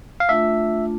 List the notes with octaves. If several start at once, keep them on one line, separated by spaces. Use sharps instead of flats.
F5
A3 D4 F4 E5